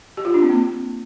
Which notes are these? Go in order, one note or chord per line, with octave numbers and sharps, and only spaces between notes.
G4
F4
D4
C4
A#3